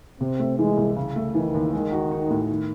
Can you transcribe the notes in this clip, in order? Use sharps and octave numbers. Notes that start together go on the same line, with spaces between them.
C3 C4
A3
E3 G#3
C2
C#3
A3
D#3 E3
D#2
D#3 G#3
F#4
D#4
A2
D#3